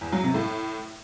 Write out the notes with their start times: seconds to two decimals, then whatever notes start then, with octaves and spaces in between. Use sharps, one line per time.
0.01 E2
0.12 F#3
0.23 C3
0.34 A2